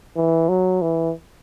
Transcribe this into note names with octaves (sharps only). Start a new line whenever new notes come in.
E3
F#3
E3